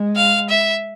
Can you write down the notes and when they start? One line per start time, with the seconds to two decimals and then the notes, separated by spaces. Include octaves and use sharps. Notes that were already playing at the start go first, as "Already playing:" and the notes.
Already playing: G#3
0.16 F5
0.49 E5